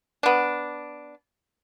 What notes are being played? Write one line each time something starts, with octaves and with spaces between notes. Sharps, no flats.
B3 D4